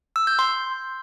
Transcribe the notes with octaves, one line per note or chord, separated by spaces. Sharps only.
E6
G6
C6